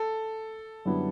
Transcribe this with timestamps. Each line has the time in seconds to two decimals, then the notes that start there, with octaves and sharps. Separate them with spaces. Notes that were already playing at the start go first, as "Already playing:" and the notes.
Already playing: A4
0.85 F#2 D3 G3 B3 E4